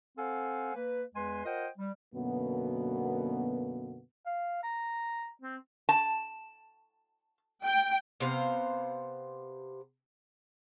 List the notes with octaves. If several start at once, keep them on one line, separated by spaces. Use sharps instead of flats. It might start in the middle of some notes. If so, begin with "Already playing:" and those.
C4 A4 C5 F5 F#5 G#5
A#3 B4
E2 G#3 B4 G#5 C6
F4 A#4 C5 D#5 F#5 G5
G3
F#2 B2 D3 A#3 B3
F5
A#5
C4
A5
G5
C3 B3 C5 F5